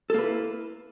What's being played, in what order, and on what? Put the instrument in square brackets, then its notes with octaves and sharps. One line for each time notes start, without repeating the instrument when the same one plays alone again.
[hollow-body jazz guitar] A4
A#3
B4
E4